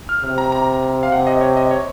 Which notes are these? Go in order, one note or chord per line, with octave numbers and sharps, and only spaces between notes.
F6
C3 F6
A#5
A#5
F5
C3 F#5
D#5
C#5
D#5
C#5